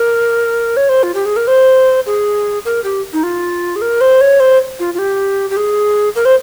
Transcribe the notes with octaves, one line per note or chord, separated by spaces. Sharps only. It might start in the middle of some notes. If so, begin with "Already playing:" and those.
Already playing: A#4
C#5
C5
F4
G4
G#4
A#4
C5
G#4
A#4
G4
D#4
F4
G#4
A#4
C5
C#5
C5
F4
F4
G4
G4
G#4
A#4
C5